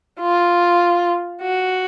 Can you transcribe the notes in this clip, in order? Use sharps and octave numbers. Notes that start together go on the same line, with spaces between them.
F4
F#4